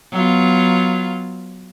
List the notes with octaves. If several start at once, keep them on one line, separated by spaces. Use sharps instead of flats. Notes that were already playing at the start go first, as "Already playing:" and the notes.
F#3 B3 F4